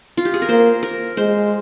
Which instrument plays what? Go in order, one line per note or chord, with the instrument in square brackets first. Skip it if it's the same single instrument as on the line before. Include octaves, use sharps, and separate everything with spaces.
[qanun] F4
G4
G#4
A#4
[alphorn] A#3 [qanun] C5
[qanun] A#4
[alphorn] G#3 [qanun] C5